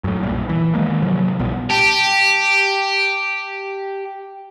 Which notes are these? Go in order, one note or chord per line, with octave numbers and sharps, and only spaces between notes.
F#2 A2
B1 A#2 G3
E3
D#3 F3 G#3 A#3
G2 C3 F3 F#3
B1 A#2 G3 B3
G4 A5